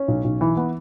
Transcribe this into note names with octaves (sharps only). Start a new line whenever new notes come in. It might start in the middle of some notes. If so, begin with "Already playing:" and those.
Already playing: C#4
B1
B1
E3
B3